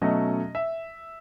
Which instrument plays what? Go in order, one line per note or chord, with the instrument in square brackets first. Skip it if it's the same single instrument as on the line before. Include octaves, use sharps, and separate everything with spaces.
[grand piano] B2 F#3 A3 C#4 D#5
E5